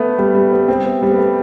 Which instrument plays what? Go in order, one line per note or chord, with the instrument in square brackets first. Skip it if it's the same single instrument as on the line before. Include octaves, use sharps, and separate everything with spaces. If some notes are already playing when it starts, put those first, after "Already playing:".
Already playing: [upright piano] A3 B3
G3
G3
B3
C4
B3
G3
B3
A3